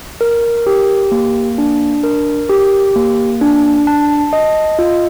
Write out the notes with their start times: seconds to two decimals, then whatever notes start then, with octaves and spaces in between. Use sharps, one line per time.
0.21 A#4
0.67 G4
1.12 A#3
1.58 D4
2.04 A#4
2.49 G4
2.96 A#3
3.41 D4
3.87 A5
4.33 D#5
4.79 F4